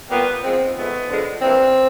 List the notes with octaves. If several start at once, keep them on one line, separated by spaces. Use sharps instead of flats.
A#2 G3 A#3 B3
G#2 F3 G#3 C4
G#2 F3 A3 B3
D3 F3 G#3
G2 E3 G3 A#3 C4